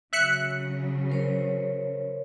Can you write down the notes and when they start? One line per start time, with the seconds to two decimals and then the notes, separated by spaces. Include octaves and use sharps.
0.13 C#3 F#3 E5 F#6 C#7
1.10 A#4 C5 C#5